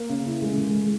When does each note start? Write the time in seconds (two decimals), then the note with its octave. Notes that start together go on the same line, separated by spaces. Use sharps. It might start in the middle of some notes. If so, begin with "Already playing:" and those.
Already playing: A#3
0.09 C#3
0.26 E4
0.42 G#3
0.58 G#3
0.75 G#3